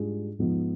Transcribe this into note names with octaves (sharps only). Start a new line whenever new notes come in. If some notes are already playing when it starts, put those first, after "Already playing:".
Already playing: G#2 G3 D4 F4 G#4
G#2 F3 B3 D#4